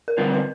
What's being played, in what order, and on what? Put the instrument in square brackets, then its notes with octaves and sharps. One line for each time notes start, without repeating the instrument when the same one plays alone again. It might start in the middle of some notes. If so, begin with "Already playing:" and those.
[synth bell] A#4
[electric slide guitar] D3 G3 C4 F4 [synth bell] B4
[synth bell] B4